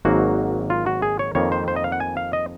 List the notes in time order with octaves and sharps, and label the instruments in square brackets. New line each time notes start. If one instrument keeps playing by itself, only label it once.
[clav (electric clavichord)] G#1 G#2 F#3 A#3 F#4
F4
F#4
G#4
C#5
F2 D#3 A#3 C#5
C5
C5
D#5
F5
F#5
G#5
F5
D#5